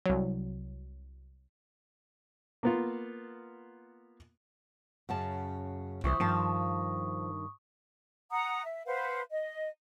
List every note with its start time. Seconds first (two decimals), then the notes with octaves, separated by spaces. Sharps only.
0.06 C2 F#3
2.63 A#3 B3 F4
5.09 F#2 C#3 A5
6.04 C2 E3 E4 C5 C#6 D#6
6.20 G2 D#3 F3 A5
8.31 F#5 A#5 D#6
8.64 E5
8.86 B4 C5 F5 F#5
9.31 D#5